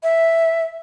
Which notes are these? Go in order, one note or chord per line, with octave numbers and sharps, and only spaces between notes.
E5